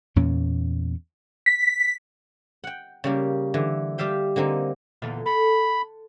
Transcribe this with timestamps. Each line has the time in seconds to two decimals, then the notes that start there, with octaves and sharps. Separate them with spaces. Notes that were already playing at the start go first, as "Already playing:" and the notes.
0.16 E2 A#2 A#3 C#4
1.46 B6
2.64 F#5 G5
3.04 C#3 G3 A#3
3.54 D3 E3
3.98 G3 G4 E5 F5 G5
4.36 D3 A#3 C4 D#4
5.02 E2 A#2 D3
5.26 A4 B5